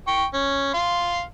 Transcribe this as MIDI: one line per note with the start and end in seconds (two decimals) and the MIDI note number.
0.08 0.25 79
0.08 0.25 85
0.34 0.72 61
0.74 1.21 77
0.74 1.21 84